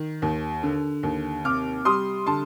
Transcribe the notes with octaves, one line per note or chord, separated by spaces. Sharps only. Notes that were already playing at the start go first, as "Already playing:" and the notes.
Already playing: D#3
D#2
D3
D#2
C3 D6 F6
G3 C6 D#6
D3 A5 C6